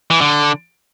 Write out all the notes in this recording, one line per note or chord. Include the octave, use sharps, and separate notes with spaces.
E3
D3